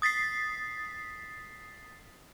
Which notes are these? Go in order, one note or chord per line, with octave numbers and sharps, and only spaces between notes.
D#6 A6 B6 C7